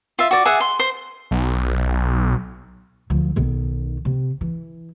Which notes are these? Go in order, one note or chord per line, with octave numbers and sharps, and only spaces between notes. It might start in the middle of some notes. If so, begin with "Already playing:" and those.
F4 E5
F#4 D5
G#4 E5 F#5
C6
C5
B1
D2 F3
B1 D#3
C3
E3